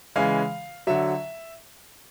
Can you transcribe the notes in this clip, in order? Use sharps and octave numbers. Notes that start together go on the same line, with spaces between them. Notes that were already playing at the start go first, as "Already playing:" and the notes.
C#3 E3 G#3 F5
D3 F#3 E5